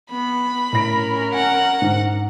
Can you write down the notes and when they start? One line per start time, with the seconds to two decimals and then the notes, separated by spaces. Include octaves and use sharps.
0.11 B3 B5
0.73 A2 C#4 A#4 A#6 D7
1.34 F#5 G#5
1.82 G#2